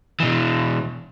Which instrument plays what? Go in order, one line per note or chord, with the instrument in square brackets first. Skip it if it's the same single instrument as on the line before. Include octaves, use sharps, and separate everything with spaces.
[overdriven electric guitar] B2 E3